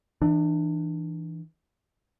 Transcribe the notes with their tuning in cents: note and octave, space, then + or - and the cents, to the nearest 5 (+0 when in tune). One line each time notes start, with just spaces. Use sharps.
E3 -10 D4 +30